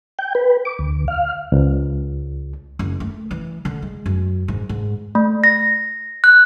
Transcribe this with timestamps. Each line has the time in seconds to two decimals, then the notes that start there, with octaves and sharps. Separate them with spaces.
0.19 G5
0.35 B4
0.65 D6
0.79 D2
1.08 F5
1.52 C#2
2.79 F#1
3.00 A3
3.31 E3
3.65 D3
3.82 G#3
4.06 F#2
4.48 G#2
4.69 G#2
5.15 A3
5.44 A#6
6.24 F#6